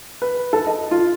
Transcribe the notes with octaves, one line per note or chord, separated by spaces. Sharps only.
B4
A4
D#5
F4